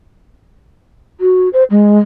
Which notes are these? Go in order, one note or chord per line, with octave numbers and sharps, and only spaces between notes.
F#4
C5
G#3